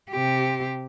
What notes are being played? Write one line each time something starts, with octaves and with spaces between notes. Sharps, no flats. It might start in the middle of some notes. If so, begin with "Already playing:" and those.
C3 G4